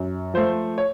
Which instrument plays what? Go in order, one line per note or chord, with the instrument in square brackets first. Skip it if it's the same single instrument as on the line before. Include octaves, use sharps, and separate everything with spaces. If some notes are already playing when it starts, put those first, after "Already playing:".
Already playing: [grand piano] F#2
F3 A3 C5
C#5